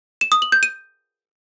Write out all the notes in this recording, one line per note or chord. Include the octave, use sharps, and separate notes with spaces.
E7
D#6
F#7
G6
D#7